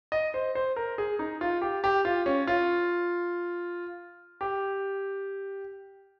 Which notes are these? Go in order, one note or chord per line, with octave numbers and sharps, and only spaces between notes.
D#5
C5
C5
A#4
G#4
D#4
F4
G4
G4
F4
C#4
F4
G4